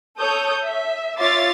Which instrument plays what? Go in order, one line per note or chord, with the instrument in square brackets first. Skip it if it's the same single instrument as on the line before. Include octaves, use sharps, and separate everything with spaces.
[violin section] A4 C#5 D#6 G6
E5
F4 C#5 E5 D6 A6 C7